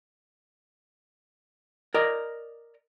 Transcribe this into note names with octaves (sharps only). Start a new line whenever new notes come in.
A#4 D5 D#5